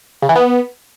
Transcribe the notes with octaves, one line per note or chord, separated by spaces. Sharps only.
C#3
E3
B3